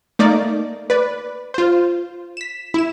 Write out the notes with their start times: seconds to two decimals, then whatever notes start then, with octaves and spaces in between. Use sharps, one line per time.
0.19 A3 A#3 D#4 D5
0.90 B4 D5
1.54 F4 C5
2.37 B6 E7
2.74 E4 E7